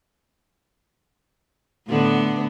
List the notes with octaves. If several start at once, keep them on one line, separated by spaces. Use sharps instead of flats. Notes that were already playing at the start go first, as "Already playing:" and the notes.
A2 D3 B3